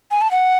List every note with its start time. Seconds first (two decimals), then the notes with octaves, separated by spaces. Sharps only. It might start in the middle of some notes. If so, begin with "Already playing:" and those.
0.11 G#5
0.21 A5
0.31 F#5